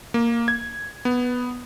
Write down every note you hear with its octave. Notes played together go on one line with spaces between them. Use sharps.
A#3
G#6
B3